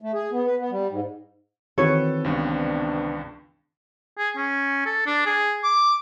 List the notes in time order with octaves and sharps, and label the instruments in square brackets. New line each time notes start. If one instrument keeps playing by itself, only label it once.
[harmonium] A3
G#4
B3
B4
B3
G3
G#2
[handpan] D#3 E3 C4 [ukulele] F#4 C#5 [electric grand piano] A4 B4
[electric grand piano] C#2 G2 [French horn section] C3 B3 D4
[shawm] G#4
C#4
A4
D4
G#4
D6